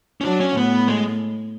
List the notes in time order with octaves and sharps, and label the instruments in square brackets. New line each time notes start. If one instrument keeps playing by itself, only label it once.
[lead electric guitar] C#4
[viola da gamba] F#3 [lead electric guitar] D4
[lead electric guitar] C#4
[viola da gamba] A2 [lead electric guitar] B3
[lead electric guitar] G#3